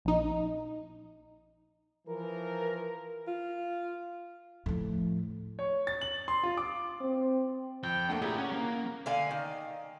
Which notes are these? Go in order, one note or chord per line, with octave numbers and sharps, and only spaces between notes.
A#1 D#4
E3 F3 A#4
F4
A2 F3
C#5
A6
F#7
C6
F4
D6
C4
F2 G5
A3 A#3 D4
A#2 E4 G4 G#4 A#5
C#4 F#5
A#3
D3 F5 G#5
D#3